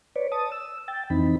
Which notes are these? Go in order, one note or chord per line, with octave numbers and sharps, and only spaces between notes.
B4 C#5 D5
A5 D#6
E6
G5 A6
F2 E3 C4 D#4 B5